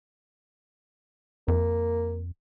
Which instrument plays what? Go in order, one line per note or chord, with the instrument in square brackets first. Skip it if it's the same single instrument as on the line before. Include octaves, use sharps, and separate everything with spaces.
[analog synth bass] F2 [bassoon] A#3